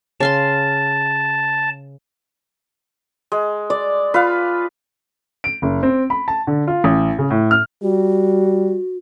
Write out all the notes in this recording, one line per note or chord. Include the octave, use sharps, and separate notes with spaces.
C#3 F5 A5 C6
G#3
D5
F4 B4 F5
D7
F#1
C4
B5
A5
D3
F4
A1
C#3
A2
F6
G3 F#4